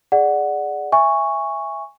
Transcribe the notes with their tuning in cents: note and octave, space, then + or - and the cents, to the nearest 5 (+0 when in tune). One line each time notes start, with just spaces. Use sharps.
G#4 +0 D5 +5 F#5 +0
E5 +0 G#5 -20 C#6 +0